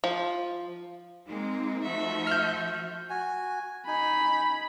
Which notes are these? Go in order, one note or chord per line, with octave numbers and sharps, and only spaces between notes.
F3
G#3 A#3 C4 D#4
F3 A3 F#4 E5
F6 G6
F#4 G#5
D#4 G#5 B5